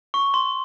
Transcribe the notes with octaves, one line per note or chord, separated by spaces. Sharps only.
C#6
C6